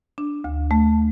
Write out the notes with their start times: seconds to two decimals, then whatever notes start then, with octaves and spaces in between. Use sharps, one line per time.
0.18 D4
0.44 D2
0.71 A3